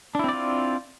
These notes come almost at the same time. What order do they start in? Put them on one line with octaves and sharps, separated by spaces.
D4 E4 C4 D5 F4